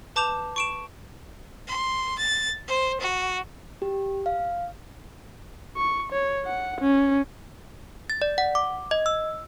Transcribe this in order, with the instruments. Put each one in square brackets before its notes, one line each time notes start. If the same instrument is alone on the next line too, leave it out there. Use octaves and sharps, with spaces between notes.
[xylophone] B4 A5 D6 G6 E7 F7
C#6 D7 E7
[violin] C6
A6
C5
F#4
[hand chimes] G4
F5
[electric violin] C#6
C#5
F#5
C#4
[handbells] A6
D5
F#5
D6
D#5
E6